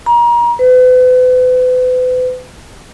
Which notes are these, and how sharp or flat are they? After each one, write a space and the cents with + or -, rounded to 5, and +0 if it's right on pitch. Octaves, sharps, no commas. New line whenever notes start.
A#5 +30
B4 +40